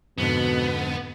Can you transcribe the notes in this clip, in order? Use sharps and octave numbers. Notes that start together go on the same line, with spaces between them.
F2 G#2 B2 D3 B3